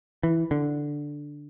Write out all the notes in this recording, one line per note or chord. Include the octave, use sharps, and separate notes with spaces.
E3
D3